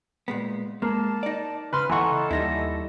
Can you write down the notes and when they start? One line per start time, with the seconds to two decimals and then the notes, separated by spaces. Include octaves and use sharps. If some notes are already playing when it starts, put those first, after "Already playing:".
0.28 A#2 G#3 B3
0.82 G#3 A#3 A5
1.23 D#4 D5
1.73 C#3 B4 C6 F6
1.90 E3 A4 D#5 F#5 A#5 C6 C#6
2.31 D#2 G3 D#4 E4 A#6